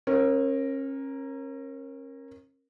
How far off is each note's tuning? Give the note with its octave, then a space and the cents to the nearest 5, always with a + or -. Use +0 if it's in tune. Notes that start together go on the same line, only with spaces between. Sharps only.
C#4 -35 A#4 +5